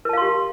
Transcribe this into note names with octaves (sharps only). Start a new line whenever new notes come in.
G4 A#4 F5 A5 C6